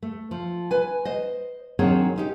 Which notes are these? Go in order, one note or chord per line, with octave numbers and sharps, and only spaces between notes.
A3
F3
B4 G#5
C5 D#5
D#3 F#3 C4 D4 G#4 C#5
C#4 D#4 G4